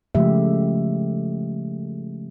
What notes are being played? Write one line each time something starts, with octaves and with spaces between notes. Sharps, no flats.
C#3 F3 G#3 A3 G4 E5